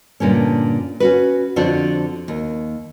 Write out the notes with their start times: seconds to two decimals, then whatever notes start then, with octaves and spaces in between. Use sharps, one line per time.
0.20 G2 A#2 D3 C#4
1.00 C#4 F#4 B4
1.56 F2 D3 C4 D4 F4 F#4
2.28 D#2